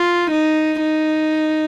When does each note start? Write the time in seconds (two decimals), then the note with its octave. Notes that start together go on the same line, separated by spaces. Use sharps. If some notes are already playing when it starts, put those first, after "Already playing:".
Already playing: F4
0.31 D#4
0.81 D#4